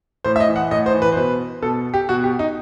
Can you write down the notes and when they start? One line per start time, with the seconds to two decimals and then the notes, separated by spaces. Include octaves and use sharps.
0.24 A2 C5
0.36 E5
0.40 D#5
0.48 E3
0.56 F#5
0.71 A2 D#5
0.86 C5
0.94 E3
1.02 B4
1.12 C5
1.16 B2 B4
1.62 B2 A4
1.94 G4
2.09 B2 F#4
2.24 G4
2.39 D#4